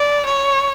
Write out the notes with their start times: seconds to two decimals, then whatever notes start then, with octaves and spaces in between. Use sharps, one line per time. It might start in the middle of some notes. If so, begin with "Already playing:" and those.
Already playing: D5
0.26 C#5